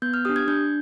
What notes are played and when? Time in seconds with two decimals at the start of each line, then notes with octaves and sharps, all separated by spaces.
0.02 B3 G6
0.14 F6
0.25 D4 G4 D#6
0.36 G#6
0.48 D4 G6